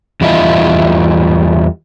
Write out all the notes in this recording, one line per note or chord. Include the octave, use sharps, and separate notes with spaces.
E2 G3 E4 F4 D#5